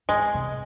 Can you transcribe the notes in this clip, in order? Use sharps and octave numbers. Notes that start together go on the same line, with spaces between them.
G#2 G#3
C3